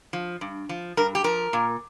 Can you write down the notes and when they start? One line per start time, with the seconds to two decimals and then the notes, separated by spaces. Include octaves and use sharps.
0.13 F3
0.41 G2
0.69 F3
0.97 G2 A#4
1.15 G4
1.24 F3 A#4
1.53 A#2